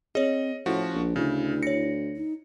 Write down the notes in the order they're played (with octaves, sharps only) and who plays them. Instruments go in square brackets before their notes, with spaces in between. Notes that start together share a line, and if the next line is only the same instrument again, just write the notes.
[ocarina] C4 [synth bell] G#4 C#5 [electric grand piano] D#5
[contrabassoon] A2 [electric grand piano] F3 F#4 [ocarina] C#4
[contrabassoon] A#1
[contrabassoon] D2 [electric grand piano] C#3 [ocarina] E4
[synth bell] C#5 A#6 [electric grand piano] C#7
[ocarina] D#4